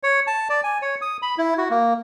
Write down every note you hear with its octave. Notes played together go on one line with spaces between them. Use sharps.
C#5
A5
D5
G#5
C#5
D#6
B5
E4
F#4
A#3